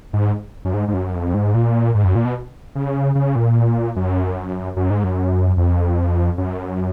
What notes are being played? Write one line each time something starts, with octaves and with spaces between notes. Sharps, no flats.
G#2
F#2
G#2
G#2
F#2
F2
G#2
A#2
G#2
F#2
A#2
B2
C#3
C#3
A#2
F#2
F#2
G#2
F#2
F2
F#2